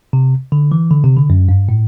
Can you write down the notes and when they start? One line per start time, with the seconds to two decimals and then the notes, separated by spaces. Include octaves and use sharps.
0.13 C3
0.52 D3
0.72 E3
0.91 D3
1.04 C3
1.16 D3
1.30 F#2
1.49 G2
1.69 A2